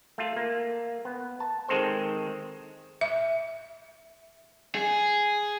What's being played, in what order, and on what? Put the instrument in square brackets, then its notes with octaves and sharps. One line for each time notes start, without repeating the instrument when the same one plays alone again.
[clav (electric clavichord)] A3 F4
A#3
B3
A5
D#3 G#3 C4 A4 C5
[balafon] E5
[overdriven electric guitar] G#4